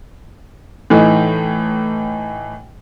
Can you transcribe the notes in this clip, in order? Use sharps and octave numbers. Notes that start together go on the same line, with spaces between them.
A2 E3 D#4